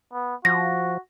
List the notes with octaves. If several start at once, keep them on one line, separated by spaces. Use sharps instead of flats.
B3
F3 F#4 A#6